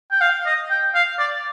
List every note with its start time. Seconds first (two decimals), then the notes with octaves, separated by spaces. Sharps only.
0.11 G5
0.21 F5
0.46 D#5
0.70 G5
0.95 F5
1.19 D5